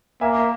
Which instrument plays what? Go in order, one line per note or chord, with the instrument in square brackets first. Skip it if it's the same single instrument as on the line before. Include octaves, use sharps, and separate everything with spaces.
[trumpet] A#3 [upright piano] E5 G#5